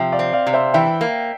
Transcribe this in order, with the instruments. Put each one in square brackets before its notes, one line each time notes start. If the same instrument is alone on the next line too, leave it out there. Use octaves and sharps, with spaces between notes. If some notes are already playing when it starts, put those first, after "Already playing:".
Already playing: [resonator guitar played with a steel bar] C3 F3 [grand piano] E5 G5
[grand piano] D5 F5
[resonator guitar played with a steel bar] C4
[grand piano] D5 F5
[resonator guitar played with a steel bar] C3
[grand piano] C5 E5
[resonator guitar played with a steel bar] E3 [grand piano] E5 G5
[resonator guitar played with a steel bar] A#3